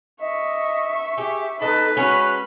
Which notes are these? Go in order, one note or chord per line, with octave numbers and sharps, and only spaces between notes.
D#5 E5 C#6
G4 G#4
D#4 A4 B4 D#5
G#3 C#4 F#4 B5